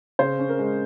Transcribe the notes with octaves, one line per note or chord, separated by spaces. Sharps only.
C#3 C5
C#4
A#4
G#3